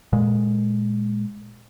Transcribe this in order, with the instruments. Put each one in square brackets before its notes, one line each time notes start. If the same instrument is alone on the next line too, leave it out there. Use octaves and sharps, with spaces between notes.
[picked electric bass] A#2 G#3